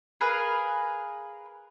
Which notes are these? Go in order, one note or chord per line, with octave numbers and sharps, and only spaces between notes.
G#4 A#4 B4 F5